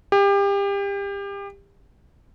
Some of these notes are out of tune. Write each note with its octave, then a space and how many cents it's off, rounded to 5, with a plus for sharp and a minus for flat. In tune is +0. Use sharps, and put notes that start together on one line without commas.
G4 +30